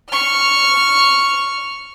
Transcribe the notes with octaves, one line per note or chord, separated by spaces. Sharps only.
C#6 F6